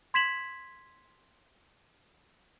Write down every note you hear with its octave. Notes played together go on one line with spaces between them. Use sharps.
C6 G#6 B6 E7 F#7